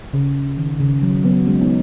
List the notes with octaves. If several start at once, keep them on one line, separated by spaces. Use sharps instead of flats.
C#3
D#3
C#3
F#3
F#3 B3
G#3 C#4
B3 D#4